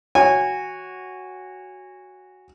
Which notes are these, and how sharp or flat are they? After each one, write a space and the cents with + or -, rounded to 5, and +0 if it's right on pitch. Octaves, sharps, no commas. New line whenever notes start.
F#4 +0 C#5 +0 G#5 -20